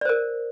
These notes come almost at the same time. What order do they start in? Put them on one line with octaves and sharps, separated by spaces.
D5 C5 A#4